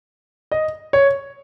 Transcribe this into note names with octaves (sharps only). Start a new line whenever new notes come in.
D#5
C#5